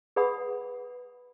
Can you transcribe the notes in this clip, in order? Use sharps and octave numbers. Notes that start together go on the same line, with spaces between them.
G#4 B4 D5 F#5 B5 D#6